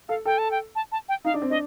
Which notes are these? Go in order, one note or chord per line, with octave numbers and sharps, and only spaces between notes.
A4 F5
A4 G5
A5
G5
A5
A5
G5
D#4 F5
D4
C4
D4 D#5